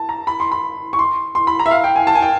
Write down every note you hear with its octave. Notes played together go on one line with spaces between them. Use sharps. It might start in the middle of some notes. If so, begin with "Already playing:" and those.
Already playing: A5
A#5
B5
C6
B5
C#6
C6
C6
B5
A#5
E5
F5
G5
G#5
A5
G#5
G5